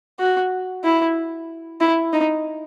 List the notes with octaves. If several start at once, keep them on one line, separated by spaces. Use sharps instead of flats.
F#4
E4
E4
D#4